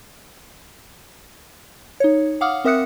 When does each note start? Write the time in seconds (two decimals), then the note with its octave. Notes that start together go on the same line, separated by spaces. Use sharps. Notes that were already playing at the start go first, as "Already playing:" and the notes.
2.00 D#4 C#5
2.41 F5 F#5 D6 D#6 F6
2.65 C4 A#4 E5 D#6 F#6 C#7